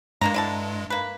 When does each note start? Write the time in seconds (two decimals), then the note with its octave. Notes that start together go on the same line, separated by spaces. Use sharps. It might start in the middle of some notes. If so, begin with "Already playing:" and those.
0.21 G2 G#3 A#3 D4 A#5
0.34 D3 E4 A5
0.90 A#3 B4